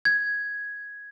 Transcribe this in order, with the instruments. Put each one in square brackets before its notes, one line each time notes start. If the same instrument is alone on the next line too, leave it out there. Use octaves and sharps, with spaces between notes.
[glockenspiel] G#6